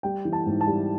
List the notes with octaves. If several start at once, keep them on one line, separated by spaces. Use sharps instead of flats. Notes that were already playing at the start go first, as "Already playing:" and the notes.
G3 G5
E3
A5
G#2
A5
G3